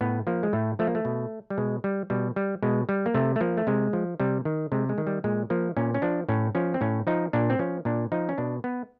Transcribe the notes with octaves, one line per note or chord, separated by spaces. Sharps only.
A2 B3
F3 A#3
G#3
A2 A3
F3 A3
A#3
A3
B2
G3
B2 G#3
G3
B2 G3
G3
B2 G#3
G3
A#3
C3 A3
A3
F3 A#3
A3
C3 G#3
F3
C3 G3
D#3
C3 G#3
G#3
D#3
G3
A#2 G#3
F3 A#3
A#2 C#4
C#4
F3 D4
A2 C#4
F3 C#4
C4
A2 C#4
F3 D#4
A#2 D4
C4
F3 C#4
A#2 D4
F3 D#4
C#4
B2 D4
B3